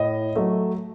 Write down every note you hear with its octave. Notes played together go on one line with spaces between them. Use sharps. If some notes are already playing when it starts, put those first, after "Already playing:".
Already playing: A2 D#5
F#3 A3 E5